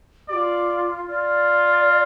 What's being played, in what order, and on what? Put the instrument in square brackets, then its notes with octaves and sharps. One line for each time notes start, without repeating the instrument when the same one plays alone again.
[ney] G4 [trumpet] D5
[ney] F4
[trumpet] F4 [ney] D5